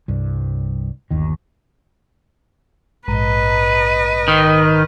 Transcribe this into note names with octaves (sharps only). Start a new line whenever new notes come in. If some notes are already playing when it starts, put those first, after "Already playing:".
C2 G2
G1 D#2 D#3
A#1 G#2 B4 D#5 A#5
D#3